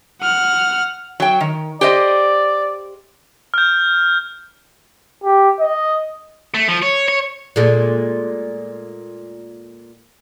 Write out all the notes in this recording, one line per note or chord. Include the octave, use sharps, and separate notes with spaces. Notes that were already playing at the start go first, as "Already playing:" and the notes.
F#5 F6
F#3 G5
D#3
G4 C5 D5 D#5
F6 G6
G4
D#5
A3
F3
C#5
C#5
A#2 G#3 A3